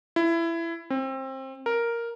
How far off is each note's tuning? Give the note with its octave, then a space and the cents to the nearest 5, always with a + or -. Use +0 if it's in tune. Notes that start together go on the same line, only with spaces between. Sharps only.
E4 +20
C4 +25
A#4 +0